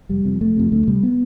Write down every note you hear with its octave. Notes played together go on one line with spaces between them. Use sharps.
F1 G3
F2 C3
F1 A3
F2 C3
D2 A3
C3 G3
B3